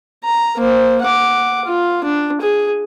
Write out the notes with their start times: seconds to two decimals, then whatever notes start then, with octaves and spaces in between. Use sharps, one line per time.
0.25 A#5
0.57 A#3 C5
1.02 F#5 D6
1.65 F4
2.04 D4
2.41 G#4